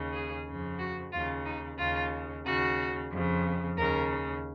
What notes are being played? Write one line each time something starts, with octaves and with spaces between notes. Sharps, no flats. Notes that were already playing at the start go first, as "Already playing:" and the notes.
Already playing: D#2 C#3
G#4
F2 C#3
F#4
D#2 C#3 F4
D#4
D#2 C#3 F4
D#2 C#3 F#4
F2
C#3
D#2 C#3 A#4